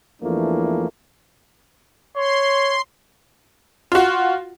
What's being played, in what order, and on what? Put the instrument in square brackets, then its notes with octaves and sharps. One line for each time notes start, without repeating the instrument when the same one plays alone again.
[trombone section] E2 E3 F3 A3 A#3 D4
[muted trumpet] C#5 [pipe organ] C6
[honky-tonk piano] F4 F#4